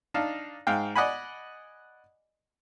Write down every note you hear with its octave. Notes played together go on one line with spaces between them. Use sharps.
D4 D#4 F5 A5
G#2 F5 G5
D5 D#5 F#5 G#5 B5